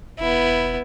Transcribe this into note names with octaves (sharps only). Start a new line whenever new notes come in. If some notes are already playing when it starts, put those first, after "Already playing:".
E1 B3 E4